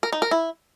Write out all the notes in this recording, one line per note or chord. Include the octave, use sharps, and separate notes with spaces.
A#4
D#4
A#4
E4